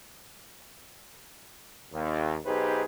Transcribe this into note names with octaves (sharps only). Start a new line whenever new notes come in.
D#2
B1 D#4 G4 G#4 B4 C5